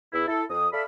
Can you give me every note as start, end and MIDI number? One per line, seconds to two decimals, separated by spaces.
0.13 0.25 40
0.13 0.25 64
0.27 0.43 64
0.27 0.43 69
0.49 0.67 41
0.49 0.67 87
0.73 0.83 69
0.73 0.83 74
0.73 0.83 76
0.73 0.83 77
0.73 0.83 83